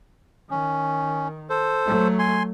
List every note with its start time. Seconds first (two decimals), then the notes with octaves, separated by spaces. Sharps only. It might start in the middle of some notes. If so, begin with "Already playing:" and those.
0.51 D#3 C#4
1.50 A4 C5
1.86 F#3 A3
2.19 G#5 C6